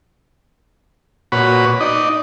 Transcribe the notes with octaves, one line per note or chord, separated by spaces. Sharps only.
A#2 F#4 B4 C#5 B5
D#4 D5 D#5